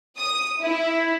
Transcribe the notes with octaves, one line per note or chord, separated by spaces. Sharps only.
D#6
E4